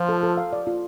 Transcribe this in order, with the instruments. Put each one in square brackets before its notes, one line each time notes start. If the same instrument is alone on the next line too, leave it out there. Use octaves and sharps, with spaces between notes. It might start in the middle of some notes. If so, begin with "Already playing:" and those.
Already playing: [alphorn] F3 [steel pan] F4
[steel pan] A4
A4
F5
D5
F4